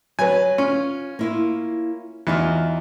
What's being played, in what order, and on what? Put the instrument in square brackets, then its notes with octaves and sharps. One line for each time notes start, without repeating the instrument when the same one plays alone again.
[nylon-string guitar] F#3 [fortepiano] B4 G#5
[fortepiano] C#4 [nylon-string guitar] F4
[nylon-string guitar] A#3 E4 F4
[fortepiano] E2 [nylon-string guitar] D#4 F4 F#4